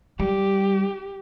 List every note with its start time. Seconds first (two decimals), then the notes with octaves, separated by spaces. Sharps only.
0.19 G3 G4